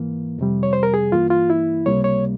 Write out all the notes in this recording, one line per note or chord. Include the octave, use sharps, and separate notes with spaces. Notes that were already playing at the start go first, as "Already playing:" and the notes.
Already playing: G#2 E3 A#3
F2 C3 G3
C#5
C5
A#4
G#4
G2 E3 A#3 F4
F4
E4
C#2 C3 G3 A#3 C#5
C#5